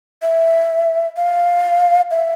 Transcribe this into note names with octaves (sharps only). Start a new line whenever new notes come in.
E5
F5
E5